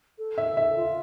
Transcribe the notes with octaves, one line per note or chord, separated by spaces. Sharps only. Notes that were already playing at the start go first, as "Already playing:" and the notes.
A4
E5
E5
F4